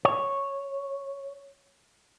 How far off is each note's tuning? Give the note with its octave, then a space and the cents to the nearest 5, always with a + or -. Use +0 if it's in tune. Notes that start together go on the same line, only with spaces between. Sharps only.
C#5 -5